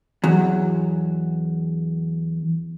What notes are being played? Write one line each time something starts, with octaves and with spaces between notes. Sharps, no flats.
E2 F#3